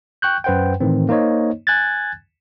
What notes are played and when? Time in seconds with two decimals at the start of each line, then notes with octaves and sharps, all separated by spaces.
0.22 G5 C#6 F#6 G6
0.44 F#2 B4 C5 F#5 G5
0.80 A2 D#3 E3 C4
1.09 A#3 D#4 C5 C#5 D#5
1.67 G#5 F#6 G#6 A6